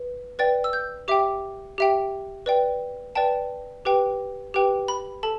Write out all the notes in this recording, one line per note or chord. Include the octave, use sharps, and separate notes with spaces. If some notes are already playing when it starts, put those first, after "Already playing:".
Already playing: B4
B4 D5 G5 A6
E6
G6
G4 E5 G5 D6
G4 E5 G5
B4 D5 G5
B4 D5 G5 A5
G4 B4 G5
G4 B4 G5
B5
A4 A5